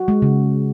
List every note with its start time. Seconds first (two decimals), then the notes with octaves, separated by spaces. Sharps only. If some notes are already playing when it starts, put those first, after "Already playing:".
Already playing: F#4
0.08 G#3
0.22 C#3